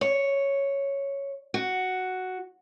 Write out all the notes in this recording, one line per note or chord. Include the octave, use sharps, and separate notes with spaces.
C#5
F#4